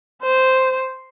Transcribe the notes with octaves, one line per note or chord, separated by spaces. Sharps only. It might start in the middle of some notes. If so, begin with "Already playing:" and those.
C5